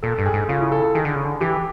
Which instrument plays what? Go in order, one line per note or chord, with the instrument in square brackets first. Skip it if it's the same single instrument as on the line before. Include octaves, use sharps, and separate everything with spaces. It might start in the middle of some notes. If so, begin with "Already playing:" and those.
[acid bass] A#2 [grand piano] A4
[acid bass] G2
[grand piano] G#4
[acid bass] G#2
[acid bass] C#3 [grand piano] F4
[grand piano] E4
A4
A4
[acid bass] D#3 [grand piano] G#4
[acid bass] D3
C#3
D3
[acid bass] E3 [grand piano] G4